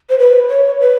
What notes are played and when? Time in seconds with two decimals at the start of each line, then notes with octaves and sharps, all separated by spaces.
0.09 C5
0.18 B4
0.49 C#5
0.80 B4